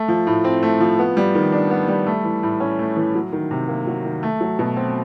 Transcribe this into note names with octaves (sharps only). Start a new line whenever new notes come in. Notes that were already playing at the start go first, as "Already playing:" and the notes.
Already playing: A3
F3
A2
C4
A3
F3
B3
G3
D#3
D4
B3
G3
A3
E3
A2
C#4
A3
E3
F#3
D#3
C3
A#3
F#3
D#3
A3
F#3
B2
C4